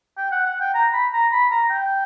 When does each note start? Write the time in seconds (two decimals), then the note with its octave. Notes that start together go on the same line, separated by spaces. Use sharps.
0.18 G5
0.32 F#5
0.46 F#5
0.60 G5
0.74 A#5
0.93 B5
1.13 A#5
1.32 B5
1.51 A#5
1.70 G5